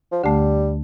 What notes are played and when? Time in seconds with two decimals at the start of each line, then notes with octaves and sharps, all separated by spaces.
0.12 F3
0.23 D2 D3 G3 A3